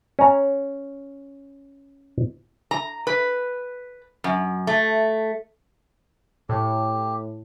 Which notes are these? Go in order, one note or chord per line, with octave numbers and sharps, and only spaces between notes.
C#4 A#5
A#5
B4
F#2
A3
A2 G4